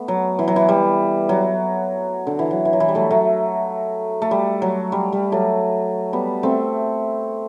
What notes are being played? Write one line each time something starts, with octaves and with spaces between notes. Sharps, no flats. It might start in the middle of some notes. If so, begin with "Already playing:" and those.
Already playing: A3 B3
F#3
E3
F#3
E3
G3
F#3
D3
E3
F#3
E3
F#3
E3
G3
F#3 A3
F#3 A3
A3
G3
F#3
G3
G3
F#3 A3
G3 B3
A3 C4